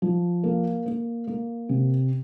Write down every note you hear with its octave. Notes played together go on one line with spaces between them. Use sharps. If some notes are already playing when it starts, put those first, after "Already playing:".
F3
A#3
A#3
A#3
C3